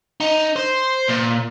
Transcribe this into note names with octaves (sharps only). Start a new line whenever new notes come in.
D#4
C5
A#2